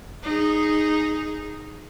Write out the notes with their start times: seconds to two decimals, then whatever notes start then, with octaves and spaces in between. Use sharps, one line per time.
0.23 D#4 G#4